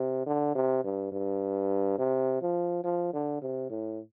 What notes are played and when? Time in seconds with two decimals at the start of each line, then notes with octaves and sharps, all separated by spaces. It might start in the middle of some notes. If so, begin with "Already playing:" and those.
Already playing: C3
0.26 D3
0.55 C3
0.84 G2
1.12 G2
1.98 C3
2.42 F3
2.84 F3
3.13 D3
3.42 C3
3.70 A2